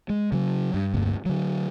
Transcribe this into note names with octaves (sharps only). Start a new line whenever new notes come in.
G#3
C#3 F#3
G2
F1 D2 G2 A#3
D3 F#3